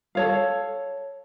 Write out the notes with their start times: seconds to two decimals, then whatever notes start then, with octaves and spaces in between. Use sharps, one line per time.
0.15 A4 C#5 F5